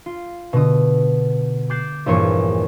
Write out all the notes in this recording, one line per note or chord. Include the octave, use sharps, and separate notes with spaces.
F4
B2 D3 D#6
D6 F#6 G6 A6 C7 E7
A#1 E2 G2 A#3 C#5 C#6